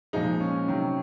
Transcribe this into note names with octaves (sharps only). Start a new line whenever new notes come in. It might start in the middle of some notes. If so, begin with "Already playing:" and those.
A#2 F3 G#3 D#4
C#4
C3 D#3 F#3